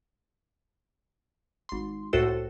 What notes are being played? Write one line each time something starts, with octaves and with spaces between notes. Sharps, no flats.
G#1 C6
C2 A2 F#4 A4 C5 E6